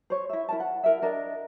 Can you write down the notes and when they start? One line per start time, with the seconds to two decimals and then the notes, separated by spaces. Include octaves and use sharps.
0.10 C5 C#5
0.30 E4 E5
0.49 E4 A#4 A5
0.60 F#5
0.84 E4 A#4 E5
1.02 D4 A#4 D#5